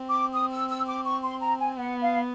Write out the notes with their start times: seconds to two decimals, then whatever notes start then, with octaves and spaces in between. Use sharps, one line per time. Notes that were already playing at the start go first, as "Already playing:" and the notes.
Already playing: C4
0.09 D6
0.33 D#6
0.51 E6
0.69 E6
0.87 D6
1.05 C#6
1.23 C6
1.41 A#5
1.59 G#5
1.77 B3 F#5
2.02 F5